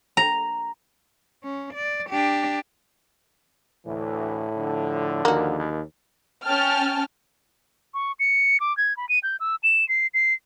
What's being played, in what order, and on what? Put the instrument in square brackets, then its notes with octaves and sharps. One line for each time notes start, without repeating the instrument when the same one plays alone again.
[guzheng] A#5
[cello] C#4
D5
D4 G4
[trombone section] D2 E3 [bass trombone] A2
[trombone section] D3 F3
[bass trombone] D#2 [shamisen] A#3 F#4
[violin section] C#4 G5 A5 F6
[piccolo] C#6
C#7
D6
G#6
B5
D#7
G6
E6
E7
C7
C7